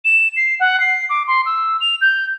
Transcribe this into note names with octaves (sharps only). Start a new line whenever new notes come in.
E7
C7
F#5
C7
D6
C6
E6
F7
G6